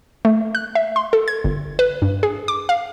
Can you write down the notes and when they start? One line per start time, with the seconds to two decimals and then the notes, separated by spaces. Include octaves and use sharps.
0.25 A3
0.55 F#6
0.75 E5
0.96 C6
1.13 A4
1.28 G#6
1.44 G1
1.79 B4
2.02 G2
2.23 G#4
2.48 D6
2.69 F5